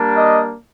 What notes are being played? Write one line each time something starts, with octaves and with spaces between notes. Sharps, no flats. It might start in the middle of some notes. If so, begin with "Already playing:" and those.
Already playing: G3 A#3 D4
D#5